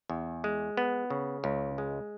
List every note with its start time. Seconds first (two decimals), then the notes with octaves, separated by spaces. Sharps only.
0.10 E2
0.44 G#3
0.77 B3
1.10 C#3
1.44 C#2
1.78 G#3